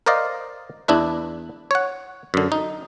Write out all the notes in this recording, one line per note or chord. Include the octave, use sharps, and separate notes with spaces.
A#4 C5 D5 D#5 F5
E2 D4 E4 B4
C#5 F#5
F#2 D3
D#4